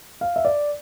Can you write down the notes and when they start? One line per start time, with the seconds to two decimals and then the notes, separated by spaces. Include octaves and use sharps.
0.21 F5
0.36 E5
0.45 D5